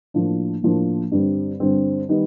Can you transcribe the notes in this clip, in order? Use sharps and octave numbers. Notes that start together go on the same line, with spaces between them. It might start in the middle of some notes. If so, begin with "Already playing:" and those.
A2 F3 A#3 D4
A2 F3 A#3 D4
G2 D3 G3 C4
G2 D3 G3 C4
D#3 G3 B3 D#4